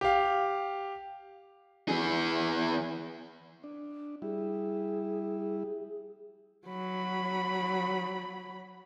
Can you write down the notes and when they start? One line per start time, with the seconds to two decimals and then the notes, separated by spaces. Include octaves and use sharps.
0.01 G4 F5
1.89 E3 G#4
3.64 D4
4.22 G3 E4 G#4
6.67 F#3 B5